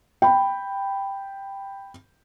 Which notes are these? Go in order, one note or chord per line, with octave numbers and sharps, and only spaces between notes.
G5 B5